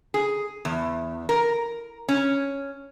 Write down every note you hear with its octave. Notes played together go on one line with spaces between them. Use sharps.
G#4
E2
A#4
C#4